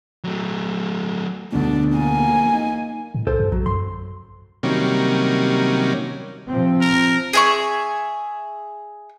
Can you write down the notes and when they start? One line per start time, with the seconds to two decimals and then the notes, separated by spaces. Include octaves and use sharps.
0.24 F#3 A3
1.53 D2 B2 D4
1.95 A#3 G#5
2.53 D#4
3.15 A2
3.27 C2 A4 C5
3.40 G2
3.52 A#1 F#3
3.66 F#2 C6
4.63 C3 D#3 F#3 G3 A#3 C#4
6.48 C3 F3 C4
6.81 A#4
7.33 G#4 E5 C#6